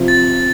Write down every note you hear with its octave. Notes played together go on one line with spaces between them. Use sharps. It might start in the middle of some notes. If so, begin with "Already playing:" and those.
Already playing: C3 F3 C4 F4
A6